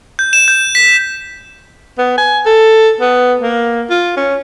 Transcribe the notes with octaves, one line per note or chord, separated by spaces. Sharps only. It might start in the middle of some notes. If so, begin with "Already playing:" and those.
G6
E7
G6
B6
B3
G#5
A4
B3
A#3
F4
C#4